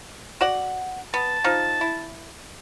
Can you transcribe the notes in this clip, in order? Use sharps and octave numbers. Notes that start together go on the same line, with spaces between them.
F#4 D5 F#5
B3 A5
F3 D#4
E4